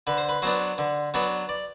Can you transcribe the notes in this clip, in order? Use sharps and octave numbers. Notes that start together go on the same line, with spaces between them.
D3 B4
C5
B4
F#3 B3 D4 C5
D3
F#3 B3 D4
D5